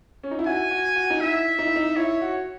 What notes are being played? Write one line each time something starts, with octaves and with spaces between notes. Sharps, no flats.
C#4
D#4
E4
F#4 G#5
F#4
F#4
D#4
E4 E5
D#4
E4
D#4
E4 C#5
F#4